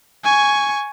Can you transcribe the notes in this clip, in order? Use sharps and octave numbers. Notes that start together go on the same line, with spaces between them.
G#5 C#6